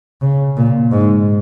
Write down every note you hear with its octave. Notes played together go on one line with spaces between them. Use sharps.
C#3
A#2
G#2